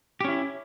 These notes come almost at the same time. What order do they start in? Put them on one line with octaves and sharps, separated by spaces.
G4 C#4 E4